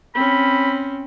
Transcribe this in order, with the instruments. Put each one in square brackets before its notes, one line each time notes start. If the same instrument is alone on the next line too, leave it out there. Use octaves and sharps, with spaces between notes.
[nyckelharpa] C4 C#4 [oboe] B5